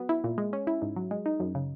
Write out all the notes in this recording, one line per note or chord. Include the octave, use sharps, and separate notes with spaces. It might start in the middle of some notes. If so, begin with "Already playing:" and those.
Already playing: F#3 B3
E4
A#2
G#3
C#4
E4
G#2
F#3
G#3
D#4
F#2
C#3